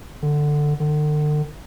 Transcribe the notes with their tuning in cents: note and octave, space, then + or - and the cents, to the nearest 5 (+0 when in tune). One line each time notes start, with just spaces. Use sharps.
D3 +10
D3 +40